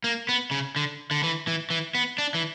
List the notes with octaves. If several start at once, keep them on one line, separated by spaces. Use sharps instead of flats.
A#3
B3
C#3
D3
D3
E3
E3
E3
B3
D4
E3